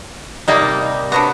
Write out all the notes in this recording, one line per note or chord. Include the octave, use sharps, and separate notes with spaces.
C3 G3 A#3 D#4
D3 F#3 B3 A#5